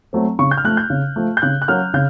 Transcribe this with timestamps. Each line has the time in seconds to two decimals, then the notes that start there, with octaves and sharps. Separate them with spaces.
0.13 F#3 A3 C4
0.39 C#3 C#6
0.51 G6
0.58 F6
0.64 F3 A3 F#6
0.77 G6
0.90 C#3
1.16 F3 A3
1.37 G6
1.42 C#3 F#6
1.62 F#6
1.68 F#3 A#3 C#4 F6
1.94 C#3 G6